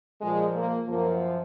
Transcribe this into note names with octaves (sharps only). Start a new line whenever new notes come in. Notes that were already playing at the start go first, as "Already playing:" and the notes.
A#2 F3 G#3
A#3
F#2 F3 A#3